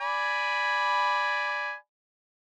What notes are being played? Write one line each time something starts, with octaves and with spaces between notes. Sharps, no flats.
D5 G#5 B5